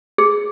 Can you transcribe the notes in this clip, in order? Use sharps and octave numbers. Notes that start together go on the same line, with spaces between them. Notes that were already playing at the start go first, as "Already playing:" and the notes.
G#4